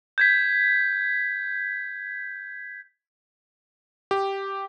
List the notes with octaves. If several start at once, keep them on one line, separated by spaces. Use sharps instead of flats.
G6 G#6 B6
G4